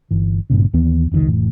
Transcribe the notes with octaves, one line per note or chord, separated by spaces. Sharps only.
G1 E3
G#1 G2 A#2 C#3
D#2 E3 B3
F1 C#2 C3 D#3
F1 A2 E3